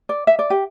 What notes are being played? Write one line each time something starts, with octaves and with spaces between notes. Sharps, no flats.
D5
E5
D5
G4